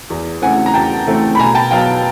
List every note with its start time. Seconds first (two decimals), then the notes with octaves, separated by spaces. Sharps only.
0.10 E2
0.42 C#3 E3 A3 C4 F#5 G#5
0.66 A#5
0.74 E2 G5 A5
1.06 C#3 E3 A3 C4
1.35 B5
1.39 B2 G#5 A#5
1.55 G5 A5
1.71 F#3 B3 F5 G5